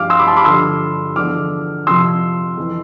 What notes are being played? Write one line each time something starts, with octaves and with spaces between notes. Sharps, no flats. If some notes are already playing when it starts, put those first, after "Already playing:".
Already playing: G2 F3 F5 D6 F6
C6 E6
B5 D6
A5 C6
B5 D6
G2 D3 F3 C6 E6
E2 D3 F3 D6 F6
F2 C3 F3 C6 E6
F2 E3